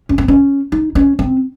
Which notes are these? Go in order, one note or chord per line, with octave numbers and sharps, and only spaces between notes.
C#4
C4
C#4
D#4
C#4
C4